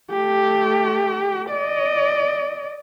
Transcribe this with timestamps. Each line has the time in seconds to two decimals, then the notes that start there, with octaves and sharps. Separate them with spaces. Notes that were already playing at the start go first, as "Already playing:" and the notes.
0.11 A3 G4
1.50 D5 D#5